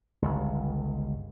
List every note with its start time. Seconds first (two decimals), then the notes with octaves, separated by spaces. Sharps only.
0.22 G1 C#2